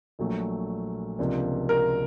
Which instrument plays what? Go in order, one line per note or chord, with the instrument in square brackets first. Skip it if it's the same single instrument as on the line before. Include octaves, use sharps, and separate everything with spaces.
[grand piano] A#1 A#2 F#3 A3
C#2 C3 F3 A#3 D4
[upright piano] A#4